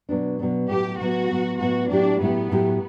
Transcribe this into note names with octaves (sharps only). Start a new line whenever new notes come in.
B2 F#3 B3 D4
B2 F#3 B3 D4
A2 F#3 B3 G4
A2 F#3 B3 F#4
A2 F#3 B3
A2 F#3 B3 F#4
A2 F#3 A3 D4 E4 G4
A2 F#3 A3 B3 E4 G4
A2 F#3 A3 E4 G4